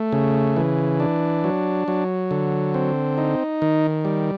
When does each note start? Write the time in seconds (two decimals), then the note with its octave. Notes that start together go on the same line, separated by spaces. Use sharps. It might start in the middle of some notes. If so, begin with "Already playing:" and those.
Already playing: A3
0.12 C#3
0.56 E3
1.00 D4
1.44 F#3
1.88 F#3
2.31 D3
2.74 C4
3.18 D#4
3.62 D#3
4.05 G3